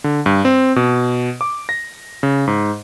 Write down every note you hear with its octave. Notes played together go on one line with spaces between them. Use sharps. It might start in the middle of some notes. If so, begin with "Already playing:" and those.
D3
G2
C4
B2
D6
A#6
C#3
G#2